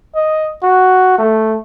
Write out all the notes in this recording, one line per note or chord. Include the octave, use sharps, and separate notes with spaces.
D#5
F#4
A3